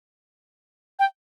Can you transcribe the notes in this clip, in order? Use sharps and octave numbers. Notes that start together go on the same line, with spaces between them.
G5